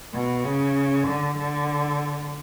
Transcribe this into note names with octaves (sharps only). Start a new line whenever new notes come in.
B2
C#3
D3
D3